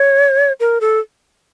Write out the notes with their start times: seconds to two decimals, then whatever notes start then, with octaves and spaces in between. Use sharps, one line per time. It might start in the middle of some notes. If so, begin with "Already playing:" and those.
Already playing: C#5
0.60 A#4
0.81 A4